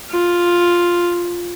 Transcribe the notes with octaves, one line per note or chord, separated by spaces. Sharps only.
F4